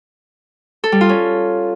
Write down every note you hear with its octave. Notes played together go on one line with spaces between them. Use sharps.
A4
G3
F4
C#4